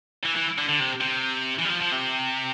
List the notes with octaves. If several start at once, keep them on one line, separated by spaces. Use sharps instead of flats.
E3
E3
D3
D3
C3
C3
E3
G3
F3
F3
C3